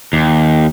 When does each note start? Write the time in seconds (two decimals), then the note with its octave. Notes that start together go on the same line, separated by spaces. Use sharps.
0.13 D#2